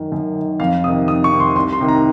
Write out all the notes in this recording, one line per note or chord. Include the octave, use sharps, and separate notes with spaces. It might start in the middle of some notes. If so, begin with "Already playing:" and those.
Already playing: F#2 D#3
F#2
D#3
F2 F5
C3 D#3 D#6
F2 D#6
C#6
C3 D#3
C6
C2 C6
C6
C3 D#3
A#5